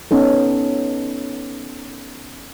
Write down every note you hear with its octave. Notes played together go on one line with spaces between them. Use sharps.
B3 C#4 D#4 A4